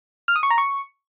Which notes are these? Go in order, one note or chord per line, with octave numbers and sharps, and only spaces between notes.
F6
D#6
C#6
A#5
C#6